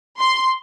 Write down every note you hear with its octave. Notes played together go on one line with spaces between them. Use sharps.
C6